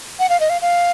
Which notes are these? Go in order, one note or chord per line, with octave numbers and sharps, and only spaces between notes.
F#5
F5
D#5
F5
F5